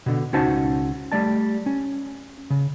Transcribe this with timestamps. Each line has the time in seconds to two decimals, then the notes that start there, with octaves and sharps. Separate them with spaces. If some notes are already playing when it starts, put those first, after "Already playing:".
0.06 B2 D3
0.33 C#2 C#4 D#4 F#4 C5 A5
1.12 G3 A3 D5 A5
1.66 C#4
2.50 C#3